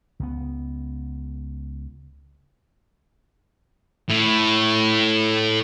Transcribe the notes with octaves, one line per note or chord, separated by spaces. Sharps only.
C#2 B3
A2